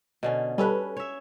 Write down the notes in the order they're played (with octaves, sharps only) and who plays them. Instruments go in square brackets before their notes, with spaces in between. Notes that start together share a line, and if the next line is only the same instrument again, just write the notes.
[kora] B2 D3 C#4
[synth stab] G3 A4 B4 [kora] C#4
[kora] C#5 E5